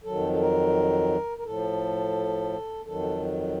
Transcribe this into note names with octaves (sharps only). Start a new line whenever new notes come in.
F2 D#3 F#3 A4
A4
A#4
A#4
A2 F3 A4
F2 D#3 F#3 A4